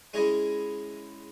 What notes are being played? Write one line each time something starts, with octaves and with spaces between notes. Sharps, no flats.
G#3 C#4 E4 G#4 C#5 D#5